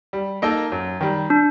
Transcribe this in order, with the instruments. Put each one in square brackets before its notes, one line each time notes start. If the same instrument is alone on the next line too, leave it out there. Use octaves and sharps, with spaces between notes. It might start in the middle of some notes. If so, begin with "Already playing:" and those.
[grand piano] G3
A#3 D#4 A4
F#2
D#3 G3
[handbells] D4